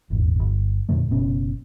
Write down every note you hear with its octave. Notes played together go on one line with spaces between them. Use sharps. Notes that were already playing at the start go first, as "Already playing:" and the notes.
D#1 G#1 E2
G1
F2 A#2 D3 A3
F#1 B2 C#4